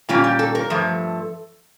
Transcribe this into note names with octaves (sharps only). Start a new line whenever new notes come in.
A#2 G3 A#3 C#4 F4
G4
A4
A#4
G2 F3 A3